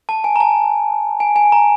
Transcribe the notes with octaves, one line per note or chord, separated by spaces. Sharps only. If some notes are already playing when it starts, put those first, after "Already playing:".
A5
G#5
A#5
A5
G#5
G#5
A#5